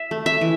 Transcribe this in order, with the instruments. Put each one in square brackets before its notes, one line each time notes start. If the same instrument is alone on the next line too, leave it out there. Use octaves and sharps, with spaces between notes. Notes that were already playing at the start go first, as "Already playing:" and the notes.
Already playing: [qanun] E5
A3
E5
E3